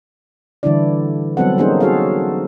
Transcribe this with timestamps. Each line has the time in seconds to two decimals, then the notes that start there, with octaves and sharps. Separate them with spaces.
0.63 D3 E3 G3 D4 E4 D5
1.37 F#3 G3 B3 C4 A4 F#5
1.58 A#3 C#4 D#4 G#4 C5
1.80 D#4 F#4 G#4 A4 C#5 F5